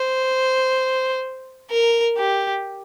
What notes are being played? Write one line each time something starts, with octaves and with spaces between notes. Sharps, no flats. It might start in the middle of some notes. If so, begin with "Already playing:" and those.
Already playing: C5
A#4
G4